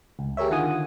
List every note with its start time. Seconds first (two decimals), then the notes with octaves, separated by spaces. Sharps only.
0.19 C#2
0.37 G4 G#4 A#4 C#5 E5
0.50 D3 D#3 F4 F#5 G#5 D#6